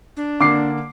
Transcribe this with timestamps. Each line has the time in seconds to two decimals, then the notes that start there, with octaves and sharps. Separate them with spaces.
0.17 D4
0.41 D3 A#3 D6 C7